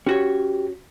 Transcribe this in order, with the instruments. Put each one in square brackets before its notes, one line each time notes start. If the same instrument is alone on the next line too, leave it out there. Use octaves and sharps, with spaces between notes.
[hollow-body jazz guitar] C#4 F#4 C#5 [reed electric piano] G4